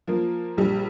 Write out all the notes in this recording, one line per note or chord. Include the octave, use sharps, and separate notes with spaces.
F3 A#3
A#1 G3